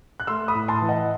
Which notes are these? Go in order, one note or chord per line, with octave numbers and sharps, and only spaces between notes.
F#6
A3 C6 E6
B5 D#6
A2
A5 C6
E3
D#5 F#5